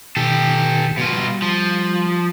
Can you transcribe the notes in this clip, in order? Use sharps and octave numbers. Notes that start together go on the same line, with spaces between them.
B2 D#3 G4 A4
B2 F#3 F4
G3
F3